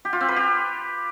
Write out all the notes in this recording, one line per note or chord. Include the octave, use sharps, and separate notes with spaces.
G4
F4
C4
B4
G4